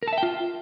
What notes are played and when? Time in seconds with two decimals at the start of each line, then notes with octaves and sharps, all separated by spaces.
0.03 A#4
0.08 A5
0.13 E5
0.18 G5
0.23 F4